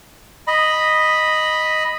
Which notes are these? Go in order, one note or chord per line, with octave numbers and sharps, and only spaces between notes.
D#5 B5